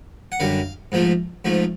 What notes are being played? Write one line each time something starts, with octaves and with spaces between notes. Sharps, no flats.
F#5
F#2 D3 G3 F5
G#2 F3 A3
G#2 F3 A3